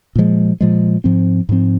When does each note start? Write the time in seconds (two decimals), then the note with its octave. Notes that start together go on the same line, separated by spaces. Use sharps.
0.16 A#2 F3 G#3
0.61 A#2 F3 G#3
1.04 G#2 F3 C4
1.49 G#2 F3 C4